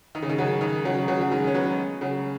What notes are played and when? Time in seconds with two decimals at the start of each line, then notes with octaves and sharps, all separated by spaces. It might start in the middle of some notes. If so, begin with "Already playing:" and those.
0.15 D#3
0.22 C#3
0.30 D#3
0.38 C#3 F#3
0.61 D#3
0.85 C#3 F#3
1.08 C#3 F#3
1.21 F#3
1.32 D#3 G#3
1.47 C#4
1.55 F#3 B3
2.01 C#3 F#3